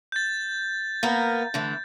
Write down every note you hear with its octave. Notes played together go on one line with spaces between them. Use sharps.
G6 A6
A#3 B3 A#4
D3 E3 A3